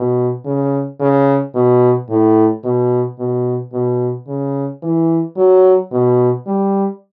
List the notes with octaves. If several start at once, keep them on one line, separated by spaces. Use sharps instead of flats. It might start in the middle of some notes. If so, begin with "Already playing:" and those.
Already playing: B2
C#3
C#3
B2
A2
B2
B2
B2
C#3
E3
F#3
B2
G3